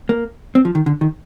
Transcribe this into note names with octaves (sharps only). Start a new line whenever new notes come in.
A#3
C4
F3
D#3
D3
D#3